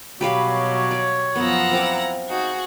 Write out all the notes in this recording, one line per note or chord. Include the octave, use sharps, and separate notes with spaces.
B2 F#3 G3 G4 B4 C#5 F5
D5
F#2 F3 B3 F#5 A#5 E6
C4 E4 F5 D6
D#4 F#4 G#4